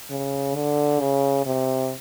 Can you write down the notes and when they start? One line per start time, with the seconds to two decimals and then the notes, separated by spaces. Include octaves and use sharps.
0.11 C#3
0.55 D3
1.00 C#3
1.46 C3